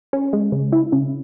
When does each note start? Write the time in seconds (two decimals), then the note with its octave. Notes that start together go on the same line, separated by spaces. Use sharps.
0.13 C#4
0.33 G#3
0.52 C#3
0.72 E4
0.92 C#3